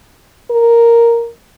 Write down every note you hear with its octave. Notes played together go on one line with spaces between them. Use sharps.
A#4